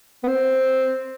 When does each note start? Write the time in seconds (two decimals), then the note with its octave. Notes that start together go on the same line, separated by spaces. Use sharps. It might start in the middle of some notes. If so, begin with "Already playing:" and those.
0.23 B3
0.28 C4